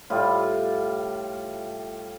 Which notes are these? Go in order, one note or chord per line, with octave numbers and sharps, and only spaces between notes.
A2 G3 F4